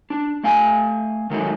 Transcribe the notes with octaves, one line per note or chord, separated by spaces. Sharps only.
D4
A3 F5 G#5
D#3 F#3 G#3 A3 D#4